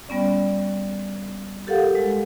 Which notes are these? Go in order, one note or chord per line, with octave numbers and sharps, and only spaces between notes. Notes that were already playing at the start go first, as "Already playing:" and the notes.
G3 B3 C#4 D5
G4 A4 A#4 F5 F#5
G#3